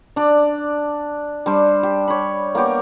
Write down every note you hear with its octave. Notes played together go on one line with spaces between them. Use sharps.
D4 D5
G3 D4 C5
G4
C#5 B5
A#3 B3 G4 C#5